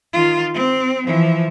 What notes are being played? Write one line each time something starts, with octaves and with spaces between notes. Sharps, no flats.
D#3 F4
C4
E3 F3